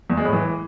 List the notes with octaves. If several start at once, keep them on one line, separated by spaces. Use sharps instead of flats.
E2
G#3
A2
E3